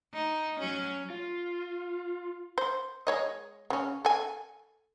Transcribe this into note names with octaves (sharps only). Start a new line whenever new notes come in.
D#4
F#3 C#4
F4
C5
G#3 C#5 D#5
C#3 C#4
A4 G#5